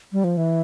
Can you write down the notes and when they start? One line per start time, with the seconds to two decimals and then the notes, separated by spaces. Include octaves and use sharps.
0.13 G3
0.24 F3
0.37 E3